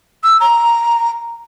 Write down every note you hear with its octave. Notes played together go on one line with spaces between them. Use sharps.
E6
A#5